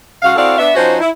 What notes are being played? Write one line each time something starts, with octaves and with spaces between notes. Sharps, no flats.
C#3 G#3 F#4 F5
C4 E4 F#4 A4 D5 F5
B3 D4 E5
F3 C#4 D#4 F#4 C5
E4